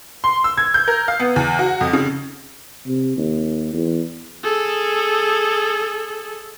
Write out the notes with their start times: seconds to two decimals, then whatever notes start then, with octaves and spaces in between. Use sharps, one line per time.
0.24 C6
0.44 E6
0.57 G#6
0.74 G6
0.88 A#4
1.08 F5
1.20 B3
1.36 E2
1.59 F#4
1.81 F2
1.93 C#3
2.87 C3
3.17 D#2
3.74 E2
4.44 G#4 A4